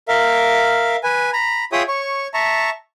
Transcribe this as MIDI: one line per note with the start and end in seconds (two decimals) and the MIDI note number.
0.08 0.96 70
0.08 0.96 76
0.08 0.96 77
1.03 1.31 71
1.03 1.31 80
1.33 1.65 82
1.33 1.65 83
1.72 1.83 65
1.72 1.83 68
1.72 1.83 73
1.72 1.83 76
1.72 1.83 79
1.72 1.83 87
1.88 2.27 73
1.88 2.27 85
2.34 2.70 76
2.34 2.70 81
2.34 2.70 82
2.34 2.70 85